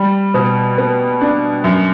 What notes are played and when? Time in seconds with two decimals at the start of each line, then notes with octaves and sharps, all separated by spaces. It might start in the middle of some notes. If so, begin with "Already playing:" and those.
Already playing: G3
0.34 B2
0.78 B3
1.21 D4
1.64 F#2